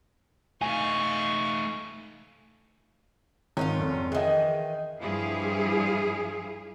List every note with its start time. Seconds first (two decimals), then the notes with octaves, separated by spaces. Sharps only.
0.61 A3 D#4 F5 G#5 C#6
3.57 G#1 C#4 D#4 F4
3.79 F1
4.12 D#3 E3 G#4 D#5
5.01 G2 F3 E4 G#4 F5